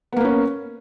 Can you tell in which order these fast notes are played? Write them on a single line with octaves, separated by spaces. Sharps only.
B3 A#3 B4 C#4